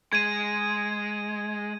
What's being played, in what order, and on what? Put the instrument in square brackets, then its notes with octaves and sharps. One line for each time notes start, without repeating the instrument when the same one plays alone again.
[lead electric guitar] G#3 [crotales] G#6 D#7